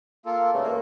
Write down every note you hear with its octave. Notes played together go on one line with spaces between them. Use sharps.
A#3 F4 A4
G2 C#3 A3
E2 G2 A#3